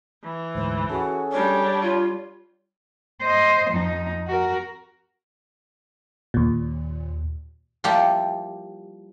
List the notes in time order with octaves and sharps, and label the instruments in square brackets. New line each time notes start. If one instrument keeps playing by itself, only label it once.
[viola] E3
[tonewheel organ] D2 G#2 [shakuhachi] C5
[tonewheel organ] C#4 G#4 A4 [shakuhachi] F#4
[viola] G3 D4 [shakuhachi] C#5
[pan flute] F4 [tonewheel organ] F5
[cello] C5 D#5
F2 D#4
F#4 A#4
[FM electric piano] D#2 A#2
[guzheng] F3 G3 A#3 E4 G4